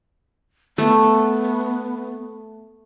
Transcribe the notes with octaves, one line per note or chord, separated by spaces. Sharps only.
A3 B3